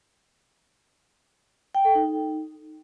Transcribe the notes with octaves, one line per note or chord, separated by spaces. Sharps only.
G5
A4
D#4